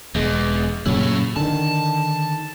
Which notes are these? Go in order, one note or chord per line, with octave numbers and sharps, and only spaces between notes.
E1 E2 G#3
F#2 A#2 C#3 E4 C#5
D3 D#3 A5